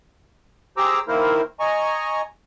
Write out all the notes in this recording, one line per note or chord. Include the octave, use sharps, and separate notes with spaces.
G4 G#4 C5 A#5 D6 E6
D#3 A#3 E4 A#4 C5
D#5 G#5 A#5 C#6